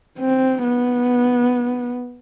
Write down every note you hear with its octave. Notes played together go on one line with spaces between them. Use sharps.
C4
B3